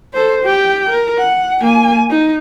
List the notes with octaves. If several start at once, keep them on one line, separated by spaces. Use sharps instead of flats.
A4 C5
G4 G5
A#4
F#5
A#3 G#5
D#4